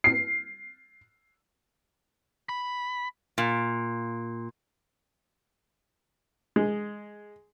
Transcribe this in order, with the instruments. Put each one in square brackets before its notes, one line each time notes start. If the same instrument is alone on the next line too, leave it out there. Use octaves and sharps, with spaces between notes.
[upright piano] C7
[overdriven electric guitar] B5
[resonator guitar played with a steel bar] A#2
[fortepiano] G#3